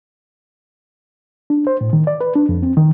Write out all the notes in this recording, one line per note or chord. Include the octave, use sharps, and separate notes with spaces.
D4
C5
A2
D#3
D5
B4
D4
F2
C4
D#3